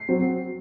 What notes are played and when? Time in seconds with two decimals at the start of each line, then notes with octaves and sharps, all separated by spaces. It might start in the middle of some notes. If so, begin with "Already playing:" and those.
Already playing: C7
0.09 F#3 C4